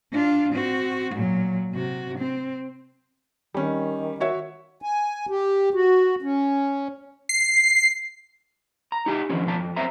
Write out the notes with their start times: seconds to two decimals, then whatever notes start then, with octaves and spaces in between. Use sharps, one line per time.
0.12 D4 F4
0.53 C4 F#4
1.15 A#2 F#3
1.73 C3 F#4
2.18 C4
3.54 D#3 G3 C#4
4.20 F#4 C#5 E5
4.82 G#5
5.29 G4
5.74 F#4
6.22 C#4
7.29 C7
8.92 A#5
9.06 D#4 G4 G#5
9.29 D#3 F3 C#4
9.46 B2 F3 A5
9.59 F2
9.76 F#2 C4 E5 A#5